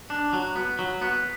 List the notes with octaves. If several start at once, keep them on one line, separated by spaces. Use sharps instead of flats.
D4
F#3
B3
F#3
B3